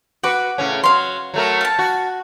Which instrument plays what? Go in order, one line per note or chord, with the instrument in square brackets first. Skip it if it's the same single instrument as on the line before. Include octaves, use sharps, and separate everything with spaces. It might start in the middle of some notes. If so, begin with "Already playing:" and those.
[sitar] F#4 B4 [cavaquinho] F#5 D6
[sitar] A2 C#3 C#4
[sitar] F#3 [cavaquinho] F5 C6
[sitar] F#3 A3 A#4
[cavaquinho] F5 A5
[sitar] F#4